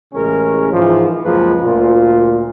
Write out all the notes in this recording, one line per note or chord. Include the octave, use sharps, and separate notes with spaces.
A1 C#3 E3 G#3 C#4 A#4
G#2 E3 F3
C#2 F#2 F3 G#3 A#3 B4
D2 A#2 F4